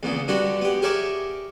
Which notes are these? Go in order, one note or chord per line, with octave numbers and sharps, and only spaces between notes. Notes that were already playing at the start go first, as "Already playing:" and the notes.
E2 A#2 C#3
G2 D3 D4 F#4 G4 B5
B3 G4
G4 G#4 A#4 C#5 D5 E5